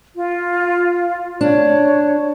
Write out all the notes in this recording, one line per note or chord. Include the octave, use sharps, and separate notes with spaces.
F4
D4 C#5